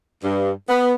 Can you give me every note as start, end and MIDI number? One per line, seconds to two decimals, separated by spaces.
0.23 0.51 43
0.69 0.93 59